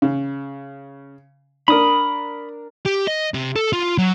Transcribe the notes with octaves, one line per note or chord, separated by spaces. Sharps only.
C#3
D4 A#4 B5 D#6
G4
D#5
C3
A4
F4
F#3